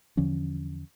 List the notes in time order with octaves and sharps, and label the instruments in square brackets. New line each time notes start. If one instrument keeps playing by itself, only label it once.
[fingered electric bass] E2 D3 F3 C#4